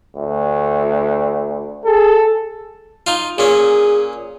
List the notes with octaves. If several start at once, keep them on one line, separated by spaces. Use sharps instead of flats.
D2
G#4 A4
D#4 F4
A#2 C#4 G#4